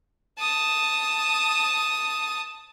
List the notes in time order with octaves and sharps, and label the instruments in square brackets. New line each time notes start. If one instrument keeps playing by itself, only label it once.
[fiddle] A5 D#6